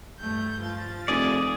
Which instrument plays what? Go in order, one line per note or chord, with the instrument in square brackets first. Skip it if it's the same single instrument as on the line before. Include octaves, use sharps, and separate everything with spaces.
[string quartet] G2 A3 G6
F3 A6
[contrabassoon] F1 [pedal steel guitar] G#4 D5